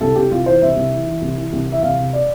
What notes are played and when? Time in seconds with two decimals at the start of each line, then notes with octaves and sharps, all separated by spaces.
0.01 C2 A4
0.16 C2 G4
0.31 C2 F4
0.46 E3 C5
0.62 C2 E5
0.76 C2
0.92 E3
1.07 E3
1.22 C2
1.37 E3
1.53 C2
1.68 E3 E5
1.83 C2 F5
1.99 C3
2.13 D5